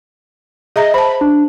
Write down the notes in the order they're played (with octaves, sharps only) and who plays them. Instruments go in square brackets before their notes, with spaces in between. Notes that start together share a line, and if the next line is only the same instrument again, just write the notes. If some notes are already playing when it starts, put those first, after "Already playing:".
[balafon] G#4 E5 A#5 [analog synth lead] D#5
[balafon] C5 A5 [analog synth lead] B5
[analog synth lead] D4